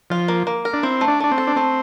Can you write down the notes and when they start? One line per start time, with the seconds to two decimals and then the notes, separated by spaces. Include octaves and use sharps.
0.10 F3 F4
0.28 A#3
0.47 A#3
0.65 A#4
0.73 D4
0.83 C4 E4
1.01 A3
1.08 D4
1.20 A3 D4
1.32 C4
1.38 A4
1.47 D4
1.56 A3 C4